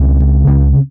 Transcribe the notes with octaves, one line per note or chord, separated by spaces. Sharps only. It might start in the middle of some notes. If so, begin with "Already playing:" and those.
Already playing: C#2 C4
C#3
C#2